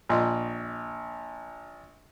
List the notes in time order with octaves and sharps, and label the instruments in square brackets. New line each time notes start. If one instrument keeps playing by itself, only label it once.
[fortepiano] A#1 [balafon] F4 D#5 C6